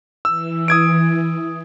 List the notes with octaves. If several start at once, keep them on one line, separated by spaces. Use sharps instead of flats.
E3 E6
D#6 G#6 D7